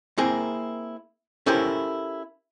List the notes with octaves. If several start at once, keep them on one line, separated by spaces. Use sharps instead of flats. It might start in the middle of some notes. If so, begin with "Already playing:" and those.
A#3 C4 E4 G#4 A#4
C#4 E4 G4 A4 A#4 C5